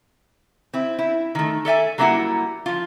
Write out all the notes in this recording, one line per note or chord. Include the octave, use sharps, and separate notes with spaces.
C4 E4
E4
D#3 A3
A4 D5 E5 G#5
F#3 G3 A#3 D4 E4 F#5
F3 F4